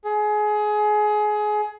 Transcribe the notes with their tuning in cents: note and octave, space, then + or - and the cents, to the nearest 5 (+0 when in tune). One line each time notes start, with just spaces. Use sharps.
G#4 +25